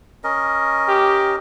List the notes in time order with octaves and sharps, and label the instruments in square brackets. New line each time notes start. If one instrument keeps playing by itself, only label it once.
[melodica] C#4 A#4 D#5
[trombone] G4